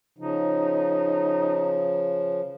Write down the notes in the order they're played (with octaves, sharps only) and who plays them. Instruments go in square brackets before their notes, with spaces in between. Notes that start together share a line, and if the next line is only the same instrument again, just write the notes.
[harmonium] C#3 F3 [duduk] D#4